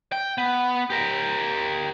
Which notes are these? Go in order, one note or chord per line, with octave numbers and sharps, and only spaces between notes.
G5
B3
G4 A#4